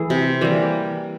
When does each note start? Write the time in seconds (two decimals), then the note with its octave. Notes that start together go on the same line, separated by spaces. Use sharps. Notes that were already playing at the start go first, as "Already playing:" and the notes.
Already playing: E3 A3 G#4
0.10 C3
0.41 E3 G3 A#3